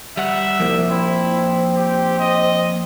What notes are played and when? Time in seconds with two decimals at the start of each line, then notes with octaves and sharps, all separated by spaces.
0.17 G3 E5 F#5
0.60 C2 F3 A#3
0.91 C4 E4
1.76 G4
2.19 D#5